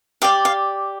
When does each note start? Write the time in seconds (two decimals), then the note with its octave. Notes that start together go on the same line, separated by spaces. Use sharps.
0.22 G4 D5 F5
0.45 F5